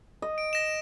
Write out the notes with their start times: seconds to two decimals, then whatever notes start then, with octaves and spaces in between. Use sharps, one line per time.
0.22 D#5
0.38 D7
0.53 A#6 E7